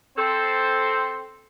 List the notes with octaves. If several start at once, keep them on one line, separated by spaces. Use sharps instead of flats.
C4 A4 C5